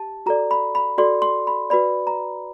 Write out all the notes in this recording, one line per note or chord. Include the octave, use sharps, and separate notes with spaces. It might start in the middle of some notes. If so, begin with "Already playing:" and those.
Already playing: G4 A5
F#4 A4 D5 A#5
B5
B5
F#4 A4 D5 C6
C6
B5
F#4 B4 D5 B5
A#5